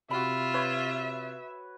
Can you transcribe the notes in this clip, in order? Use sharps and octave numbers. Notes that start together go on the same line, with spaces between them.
C3 F4 F#4 E5 B5
B4 C#5